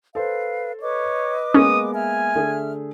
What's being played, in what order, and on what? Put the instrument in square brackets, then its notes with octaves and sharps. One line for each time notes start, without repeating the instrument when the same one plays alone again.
[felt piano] A4 C5 [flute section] B4 F5
[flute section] B4 D#5 D6 [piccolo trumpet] C#5
[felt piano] G#3 A#3 B3 [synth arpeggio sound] C#4 [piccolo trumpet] D#6
[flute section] E5 F6 [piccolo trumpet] G#5
[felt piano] D3 A3 G#4